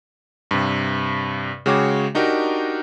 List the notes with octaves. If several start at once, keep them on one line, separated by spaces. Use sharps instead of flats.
G2 C3
C#3 G#3 F#4 C#5 G5 D6
D4 D#4 F#4 G4 A#4